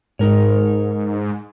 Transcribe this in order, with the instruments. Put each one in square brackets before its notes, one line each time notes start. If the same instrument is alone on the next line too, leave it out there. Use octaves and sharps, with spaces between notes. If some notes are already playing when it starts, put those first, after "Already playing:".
[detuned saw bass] G#2 [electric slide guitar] D#4 A#4 C#5